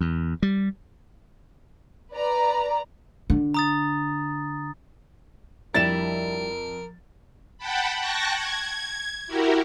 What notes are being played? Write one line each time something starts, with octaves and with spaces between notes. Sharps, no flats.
E2
G3
B4 D5 A#5
D3
A#5 D#6 A6
F2 G3 D4 E4 A#4 A6 E7
F#5 G5 A5 B5
G5 A5 C#6 F#6 A#6
G#6
E4 F#4 G4 A#4